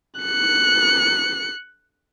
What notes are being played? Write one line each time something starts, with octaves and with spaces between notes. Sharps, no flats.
F#6 C#7